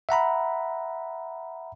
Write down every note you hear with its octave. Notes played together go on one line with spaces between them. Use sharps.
E5 F#5 A#5 B5